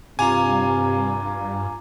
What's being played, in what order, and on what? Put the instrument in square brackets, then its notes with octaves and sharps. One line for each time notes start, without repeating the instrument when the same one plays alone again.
[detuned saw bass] G2 [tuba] C3 [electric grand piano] F4 G#5 [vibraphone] F5 A#5 D6